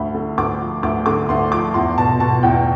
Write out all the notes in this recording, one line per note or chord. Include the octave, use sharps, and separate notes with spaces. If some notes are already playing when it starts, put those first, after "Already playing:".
Already playing: D2 B5
D3
D2 D6
F3
D2 D6
D3 D6
D2 C6
F3 D6
E2 C6
B2 A5
B2 A5
E2 G5